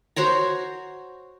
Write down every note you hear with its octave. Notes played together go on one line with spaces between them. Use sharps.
F#4 C5 C#5 A#5